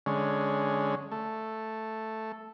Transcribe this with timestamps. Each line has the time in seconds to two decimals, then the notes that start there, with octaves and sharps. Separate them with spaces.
0.06 D3 G#3 C#4
1.12 A3